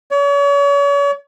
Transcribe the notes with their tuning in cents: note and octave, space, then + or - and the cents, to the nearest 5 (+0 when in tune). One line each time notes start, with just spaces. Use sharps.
C#5 +40